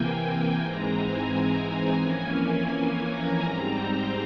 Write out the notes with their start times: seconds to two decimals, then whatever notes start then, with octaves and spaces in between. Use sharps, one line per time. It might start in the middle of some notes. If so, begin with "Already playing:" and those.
Already playing: C3 E3 A#3 G5 G#5
0.58 G#2 E3 G#3 C4 A#5
0.94 G#5
1.63 G#5
1.99 F2 E3 A#3 C#4
3.05 A#5
3.39 G#2 G3 C4
3.74 C5